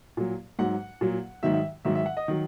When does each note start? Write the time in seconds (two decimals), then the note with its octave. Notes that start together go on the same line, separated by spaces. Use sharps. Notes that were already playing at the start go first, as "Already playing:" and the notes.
0.17 A#2 F#3
0.59 G#2 F#3 F#5
1.01 A#2 F#3
1.43 G#2 D#3 F#3 E5
1.54 E5
1.85 G#2 D#3 F#3 E5
1.95 E5
2.06 F#5
2.17 D#5
2.28 D#3 F#3